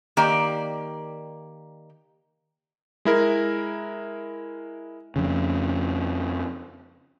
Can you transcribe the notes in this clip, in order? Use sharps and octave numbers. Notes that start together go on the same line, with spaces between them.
D#3 A#3 G4 D5
G#3 E4 A#4
F2 C#3